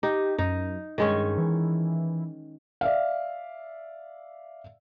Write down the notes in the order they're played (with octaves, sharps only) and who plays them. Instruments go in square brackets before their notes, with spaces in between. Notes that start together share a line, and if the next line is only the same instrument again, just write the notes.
[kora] D#4 [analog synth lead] G4
[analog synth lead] F#2 [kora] D#4
[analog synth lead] G2 [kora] D#3 G#3 C#4
[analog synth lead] E3
[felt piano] D5 E5 F5